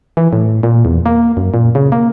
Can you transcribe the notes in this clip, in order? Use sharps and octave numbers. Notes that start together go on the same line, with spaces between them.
E3
A2
A#2
E2
A#3
F#2
A#2
C#3
A#3